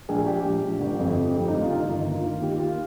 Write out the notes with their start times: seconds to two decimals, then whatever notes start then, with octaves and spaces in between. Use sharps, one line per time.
0.09 A#1 G#4
0.26 F3 G4
0.44 A#1
0.62 A#1
0.80 G1
0.99 F2
1.17 F3
1.34 F2 G4
1.48 D3 D#4
1.61 F4
1.71 G1 D#4
1.88 D#3 D#4
2.06 A#3
2.15 F4
2.24 D#2
2.42 D#2 G4
2.60 A#3 F4